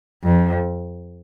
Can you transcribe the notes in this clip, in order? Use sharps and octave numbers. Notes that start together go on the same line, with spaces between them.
F2